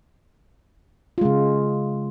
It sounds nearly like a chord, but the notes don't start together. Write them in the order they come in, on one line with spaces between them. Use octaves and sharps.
F4 G#3 C#3